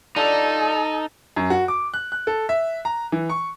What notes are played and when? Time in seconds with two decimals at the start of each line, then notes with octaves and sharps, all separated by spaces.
0.16 G3 D4 D#4 F4 A4
1.36 F#2
1.50 F#4
1.68 D6
1.94 F#6
2.12 F#6
2.27 A4
2.49 E5
2.85 A#5
3.12 E3
3.30 C#6